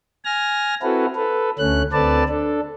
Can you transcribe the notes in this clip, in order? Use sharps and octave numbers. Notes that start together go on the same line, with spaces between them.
G#5 F6 A#6
C4 E4 F#4 A4 B4
A4 B4
D2 A3 C#4 F#6
D2 C4 A4 B4 D5 A5
D4 A4